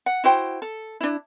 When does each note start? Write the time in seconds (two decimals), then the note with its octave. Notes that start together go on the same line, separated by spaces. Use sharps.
0.06 F#5
0.24 E4 F#4 C5 G5
0.62 A4
1.00 D4 E4